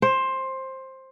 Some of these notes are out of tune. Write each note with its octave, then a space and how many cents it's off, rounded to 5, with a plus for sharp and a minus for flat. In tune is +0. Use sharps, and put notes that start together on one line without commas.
C5 +15